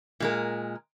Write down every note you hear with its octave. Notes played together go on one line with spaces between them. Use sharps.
A#2 G#3 A#4